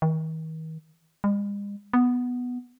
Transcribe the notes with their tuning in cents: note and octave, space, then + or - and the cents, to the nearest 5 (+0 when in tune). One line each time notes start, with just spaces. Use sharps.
D#3 +40
G#3 -45
B3 +0